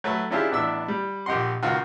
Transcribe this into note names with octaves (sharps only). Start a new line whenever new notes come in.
F#3 A3 B4
C#4 D4 E4 F4 G4 G#4
A1 B3 D4 E4 E6
G3
A#1 G4 D#5 F#5 C6
C#2 D#3 F4 F#4